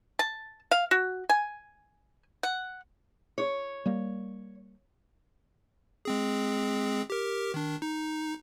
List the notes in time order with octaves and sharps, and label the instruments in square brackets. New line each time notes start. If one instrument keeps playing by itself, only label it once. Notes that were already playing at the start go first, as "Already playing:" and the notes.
[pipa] A5
F5
F#4
G#5
F#5
[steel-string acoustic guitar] C#5
[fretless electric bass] G3 A#3
[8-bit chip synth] G#3 C4 G#4
G4 A#4
D#3 D4
D#4